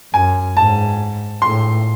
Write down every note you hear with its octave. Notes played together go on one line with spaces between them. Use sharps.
F#2 G#5
G#2 A5
A2 C6